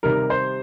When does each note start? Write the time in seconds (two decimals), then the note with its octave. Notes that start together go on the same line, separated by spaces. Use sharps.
0.03 C3 D#3 G3 A#4
0.30 C5